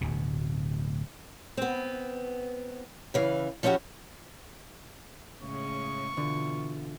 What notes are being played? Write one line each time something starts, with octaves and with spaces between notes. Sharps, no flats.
D1 D2 B2
B3 C4
C#3 E3 F5
F3 C#4 D#4 E4 F#4 G4
A2 C#3 G#3 C#6
B2 D3 E3 F4